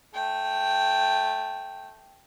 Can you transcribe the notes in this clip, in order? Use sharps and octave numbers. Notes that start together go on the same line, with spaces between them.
A3 G5